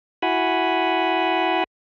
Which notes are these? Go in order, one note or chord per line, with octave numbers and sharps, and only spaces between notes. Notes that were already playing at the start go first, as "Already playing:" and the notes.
E4 F#4 F#5 G#5 B5